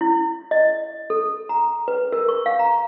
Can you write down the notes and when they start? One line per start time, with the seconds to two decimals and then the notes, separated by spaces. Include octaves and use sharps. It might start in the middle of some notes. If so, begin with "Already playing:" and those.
0.01 E4
0.51 D#5
1.10 A4
1.49 A#5
1.88 B4
2.12 A#4
2.28 C#6
2.46 F5
2.59 A#5